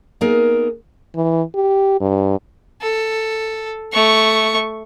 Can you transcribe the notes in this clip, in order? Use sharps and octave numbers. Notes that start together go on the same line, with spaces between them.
A#3 B3 D#4 G#4 A#4
E3
G4
G2
A4
A3 C#6